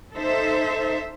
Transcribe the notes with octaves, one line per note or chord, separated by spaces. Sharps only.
D#4 A4 C5 E5